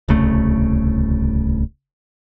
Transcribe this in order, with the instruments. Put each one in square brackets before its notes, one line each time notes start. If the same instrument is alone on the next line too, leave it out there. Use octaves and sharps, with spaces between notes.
[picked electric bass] D1 C2 C#3 A3